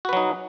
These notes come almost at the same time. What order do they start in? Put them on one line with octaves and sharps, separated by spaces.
F#4 B4 F#3 D#4